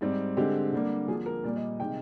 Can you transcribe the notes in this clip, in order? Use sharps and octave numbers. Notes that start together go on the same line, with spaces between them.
G#2 G3 C4
D3 G#3 C4 G4
D3 G3 A#3
D3 F3 A#3 G#4
A#4
A#2 G3 A#3 D5
D#5
C3 D#3 G#3 G5